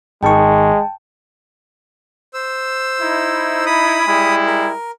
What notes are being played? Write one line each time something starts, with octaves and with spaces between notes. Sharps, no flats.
G#1 D#3 G#3 G5 A5 C#6
C5 E6
D#4 E4
B5 D#6
G3 G#3 E4
A#4